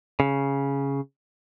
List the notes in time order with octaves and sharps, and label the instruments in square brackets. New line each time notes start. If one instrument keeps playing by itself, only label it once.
[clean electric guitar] C#3